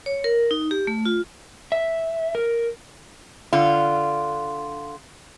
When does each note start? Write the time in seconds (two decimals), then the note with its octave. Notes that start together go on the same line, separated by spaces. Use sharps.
0.06 C#5
0.24 A#4
0.51 D#4
0.71 G4
0.87 A3
1.05 F4
1.72 E5
2.35 A#4
3.53 D3 F4